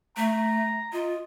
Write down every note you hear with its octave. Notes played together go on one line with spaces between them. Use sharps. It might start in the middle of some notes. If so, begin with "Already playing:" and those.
A3 A#5
F4 D#5